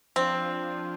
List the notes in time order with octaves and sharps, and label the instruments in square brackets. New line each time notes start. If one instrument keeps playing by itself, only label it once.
[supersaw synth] F3 D4 F4 [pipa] C4